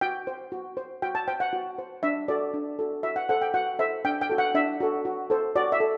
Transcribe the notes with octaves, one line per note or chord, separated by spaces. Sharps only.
F#4 G5
C5
F#4
C5
F#4 G5
A5
C5 G5
F#5
F#4
C5
D4 E5
F#4 A4 D5
D4
F#4 A4
F#4 E5
F#5
A4 C5 F#5
G5
F#4 F#5
A4 C5 E5
D4 G5
G5
F#4 A4
F#5
D4 E5
F#4 A4
F#4
A4 C5
F#4 D5
E5
A4